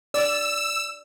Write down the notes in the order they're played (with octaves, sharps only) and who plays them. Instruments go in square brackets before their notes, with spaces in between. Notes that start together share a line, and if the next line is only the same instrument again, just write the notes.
[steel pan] D5 [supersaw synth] E6